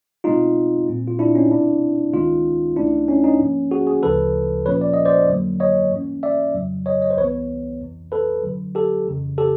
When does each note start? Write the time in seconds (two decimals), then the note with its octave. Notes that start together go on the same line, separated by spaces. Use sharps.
0.24 B2 G#3 C4 D#4 F4
0.88 A#2 G3 C4
1.07 F4
1.19 D4 E4
1.35 C#4 D#4
1.51 B2 G3 C4 D4 E4
2.13 C#2 C3 D#3 G#3 C#4 D#4 F4
2.77 C#2 C3 E3 A3 C#4 D4 E4
3.08 C#4 D#4
3.24 C#4 D#4
3.40 G#2 F3 A#3 C#4
3.71 F#4 G#4
3.87 F#4 G#4
4.03 D2 C#3 F3 A4 B4
4.66 A#2 F3 A#3 C#4 B4 C#5
4.81 D5
4.94 D#5
5.05 C5 D5
5.29 F2 D3 F#3 A#3
5.60 C#5 D#5
5.91 G#2 E3 G3 A#3 C#4
6.23 D5 E5
6.54 F2 C#3 F#3
6.86 C#5 D#5
7.02 C#5 D#5
7.10 C5
7.17 C2 C3 E3 G3 B3 B4 C#5
7.81 F2 C3 E3
8.12 A4 B4
8.43 F#2 D3 F#3
8.75 G4 A4
9.06 F2 C#3 E3
9.38 G4 A4